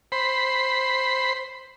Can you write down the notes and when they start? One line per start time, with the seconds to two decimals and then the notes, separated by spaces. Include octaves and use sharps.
0.12 C5 B5